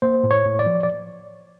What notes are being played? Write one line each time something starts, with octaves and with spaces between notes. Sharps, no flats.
A#3 C5
A2
C#5
A2
D5
F3
D5